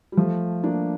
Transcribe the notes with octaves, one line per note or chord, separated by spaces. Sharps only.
G3
F3 A3
A#3 D4